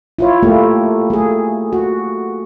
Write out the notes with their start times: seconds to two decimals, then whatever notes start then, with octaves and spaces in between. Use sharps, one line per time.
0.19 E4 F4 C#5
0.43 A3 A#3 E4 G4
1.10 A3 G#4
1.73 F#4